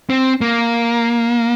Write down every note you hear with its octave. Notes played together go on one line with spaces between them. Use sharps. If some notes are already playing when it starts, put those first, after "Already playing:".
C4
A#3